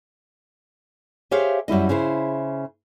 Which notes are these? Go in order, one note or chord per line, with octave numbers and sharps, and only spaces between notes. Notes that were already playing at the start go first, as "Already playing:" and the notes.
G4 G#4 C5 C#5 E5 F5
F#2 G3 E4 D#5
C#3 E4 C5